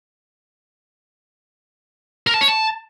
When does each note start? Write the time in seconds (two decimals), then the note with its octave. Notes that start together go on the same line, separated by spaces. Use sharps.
2.27 A#4
2.34 A5
2.41 C#5
2.48 A5